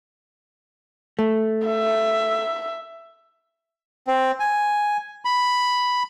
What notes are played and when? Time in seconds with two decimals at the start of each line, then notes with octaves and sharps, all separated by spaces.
1.19 A3
1.68 E5
4.07 C4
4.40 G#5
5.25 B5